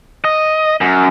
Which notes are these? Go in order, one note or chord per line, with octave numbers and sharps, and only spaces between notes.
D#5
F#2